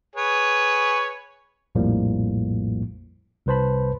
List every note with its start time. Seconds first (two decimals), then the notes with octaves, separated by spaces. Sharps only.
0.16 G#4 B4 C#5
1.75 A#1 F2 A2 F3 G3 A#3
3.46 C2 C3 B4 C5 A5 B5